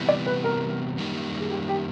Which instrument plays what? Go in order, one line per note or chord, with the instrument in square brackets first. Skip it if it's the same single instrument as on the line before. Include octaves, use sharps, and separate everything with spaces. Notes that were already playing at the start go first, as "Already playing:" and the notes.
Already playing: [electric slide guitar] C3 E3 G3 B3
[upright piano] D5
B4
A#4
[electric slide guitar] F#2 D#3 G3 A#3
[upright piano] G#4
G4
G4